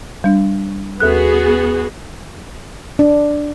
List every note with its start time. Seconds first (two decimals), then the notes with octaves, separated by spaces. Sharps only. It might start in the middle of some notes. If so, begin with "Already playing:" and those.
0.24 G3 D4
1.00 D#2 B3 F#4 G#4 A4 F#6
2.99 D4